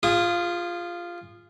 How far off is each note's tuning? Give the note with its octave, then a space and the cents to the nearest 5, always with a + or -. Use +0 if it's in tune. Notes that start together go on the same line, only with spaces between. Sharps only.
F4 -5 G#4 -30 D#6 +0